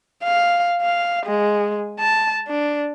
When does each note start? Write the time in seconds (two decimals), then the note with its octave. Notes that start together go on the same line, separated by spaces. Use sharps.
0.24 F5
0.82 F5
1.26 G#3
1.99 A5
2.48 D4